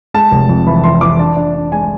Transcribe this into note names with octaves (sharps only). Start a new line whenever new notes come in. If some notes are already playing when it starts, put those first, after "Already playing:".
G#3 A5
F1
F2
E3 B5
E3 C6
E3 D6
D4 A5
D4
D4
G#3 G#5